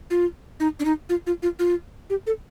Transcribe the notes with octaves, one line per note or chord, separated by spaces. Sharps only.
F4
D#4
D4
D#4
F4
F4
F4
F4
G4
A4